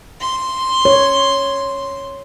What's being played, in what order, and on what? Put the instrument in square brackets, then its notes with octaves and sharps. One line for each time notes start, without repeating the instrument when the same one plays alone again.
[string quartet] C6
[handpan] C#5